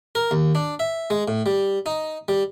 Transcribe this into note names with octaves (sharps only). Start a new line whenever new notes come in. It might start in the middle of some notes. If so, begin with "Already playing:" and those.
A#4
D#2
D4
E5
G#3
A2
G3
D#4
G3